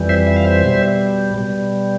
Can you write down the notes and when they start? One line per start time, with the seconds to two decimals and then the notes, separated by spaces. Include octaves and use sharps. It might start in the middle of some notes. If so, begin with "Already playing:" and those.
Already playing: F2 E3 G3
0.09 C5 E5
0.27 E5
0.36 F5
0.45 C5 E5
0.63 B2 G3
1.35 B2 G3